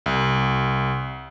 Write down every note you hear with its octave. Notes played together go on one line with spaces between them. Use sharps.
C2